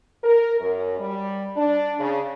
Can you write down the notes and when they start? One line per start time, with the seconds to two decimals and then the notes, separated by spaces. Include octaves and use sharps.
0.24 A#4
0.60 F#2
0.99 G3
1.56 D4
1.99 C#3